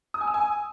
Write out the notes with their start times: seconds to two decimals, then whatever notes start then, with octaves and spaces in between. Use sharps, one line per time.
0.14 D#6
0.21 G#5
0.27 E6
0.34 G#5